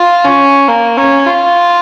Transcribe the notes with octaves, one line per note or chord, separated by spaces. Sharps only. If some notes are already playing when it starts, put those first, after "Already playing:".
Already playing: F4
C#4
A#3
C#4
F4